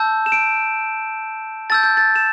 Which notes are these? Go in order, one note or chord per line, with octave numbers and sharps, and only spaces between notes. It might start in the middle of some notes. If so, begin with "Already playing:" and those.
Already playing: A5 E6 G6
E7
D7
A5 E6 G6 A6
G6
A6
E7